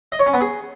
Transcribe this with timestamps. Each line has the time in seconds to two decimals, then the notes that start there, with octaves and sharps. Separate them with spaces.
0.12 D#5
0.19 C#5
0.26 C#4
0.34 B3
0.41 G#4